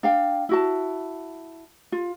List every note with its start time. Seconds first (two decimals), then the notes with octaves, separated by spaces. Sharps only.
0.03 D4 F5 G5
0.49 E4 F#4 A5
1.92 F4